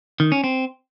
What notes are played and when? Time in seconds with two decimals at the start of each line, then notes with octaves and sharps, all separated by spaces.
0.20 D#3
0.32 C#4
0.44 C4